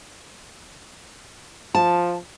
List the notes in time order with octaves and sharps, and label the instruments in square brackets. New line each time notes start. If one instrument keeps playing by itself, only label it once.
[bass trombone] F3 [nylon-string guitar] A5